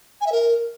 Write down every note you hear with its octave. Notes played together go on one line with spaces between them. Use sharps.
G#5
E5
A#4